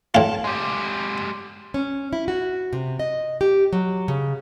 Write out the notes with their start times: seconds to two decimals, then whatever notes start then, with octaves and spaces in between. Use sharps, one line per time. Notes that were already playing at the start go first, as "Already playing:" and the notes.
0.15 A2 F4 A5
0.44 G#3 G4
1.74 C#4
2.13 E4
2.28 F#4
2.73 C3
2.99 D#5
3.41 G4
3.73 F#3
4.08 C#3